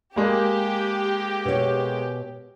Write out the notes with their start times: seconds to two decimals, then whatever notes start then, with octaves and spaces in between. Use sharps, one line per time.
0.16 G#3 A#3 G4
1.45 B2 C#5